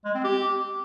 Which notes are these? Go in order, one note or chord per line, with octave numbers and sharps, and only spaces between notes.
G#3
C4
G4